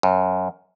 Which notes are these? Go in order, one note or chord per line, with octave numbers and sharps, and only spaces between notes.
F#2